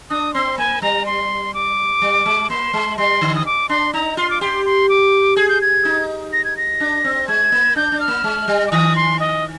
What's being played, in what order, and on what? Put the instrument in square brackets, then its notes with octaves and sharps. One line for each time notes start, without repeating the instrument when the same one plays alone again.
[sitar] D4 [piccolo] D#6
[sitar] C4 [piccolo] C6
[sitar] A#3 [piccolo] G#5
[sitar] G3 [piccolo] A#5
[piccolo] C6
D6
[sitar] G3
G#3
[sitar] A#3 [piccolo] C6
[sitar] G#3
[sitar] G3 [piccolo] C6
[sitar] D3
[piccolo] D#6
D6
[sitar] D4 [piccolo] C6
[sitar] D#4 [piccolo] A#5
[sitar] F4 [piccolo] C6
[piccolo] D6
[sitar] G4 [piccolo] C6
[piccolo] C6
D6
[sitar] G#4 [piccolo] G#6
[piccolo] G6
G#6
[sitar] D#4
[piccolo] A#6
G#6
A#6
[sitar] D4
C4
[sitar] G#3 [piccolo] G#6
[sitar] A#3
[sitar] D4 [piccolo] G6
[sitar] D4
[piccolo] F6
[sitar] A#3
G#3
G3
[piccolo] D6
[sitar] D#3 [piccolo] D#6
[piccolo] C6
D#5